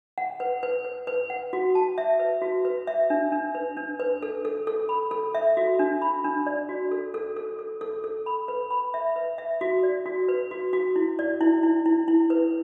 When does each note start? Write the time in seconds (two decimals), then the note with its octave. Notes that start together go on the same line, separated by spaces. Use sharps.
0.18 F#5
0.40 B4
0.63 B4
0.85 B4
1.07 B4
1.30 F#5
1.53 F#4
1.75 A5
1.98 E5
2.19 B4
2.42 F#4
2.65 B4
2.87 E5
3.10 D4
3.32 D4
3.55 B4
3.77 D4
4.00 B4
4.23 A4
4.45 A4
4.67 A4
4.89 B5
5.11 A4
5.35 E5
5.57 F#4
5.79 D4
6.02 B5
6.24 D4
6.46 D5
6.69 F#4
6.91 A4
7.14 A4
7.36 A4
7.59 A4
7.81 A4
8.04 A4
8.26 B5
8.48 B4
8.71 B5
8.94 E5
9.16 B4
9.38 E5
9.61 F#4
9.83 D5
10.06 F#4
10.28 B4
10.51 F#4
10.73 F#4
10.96 E4
11.19 D5
11.41 E4
11.63 E4
11.86 E4
12.08 E4
12.30 B4